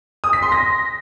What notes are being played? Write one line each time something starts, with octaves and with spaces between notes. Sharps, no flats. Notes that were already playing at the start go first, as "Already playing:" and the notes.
D#6
B6
C6
A#6